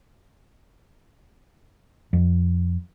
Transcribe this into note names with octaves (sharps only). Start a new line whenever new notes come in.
F2